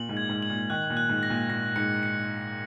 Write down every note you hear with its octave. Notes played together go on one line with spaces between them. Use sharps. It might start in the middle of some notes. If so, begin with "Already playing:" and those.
Already playing: A#2 F#7
G#2
G#6
G#2
F#7
A#2
D#3 F#6
A#2
F#6
G#2
A#6
A#2
A#2 A#6
G#2 C#7
C#7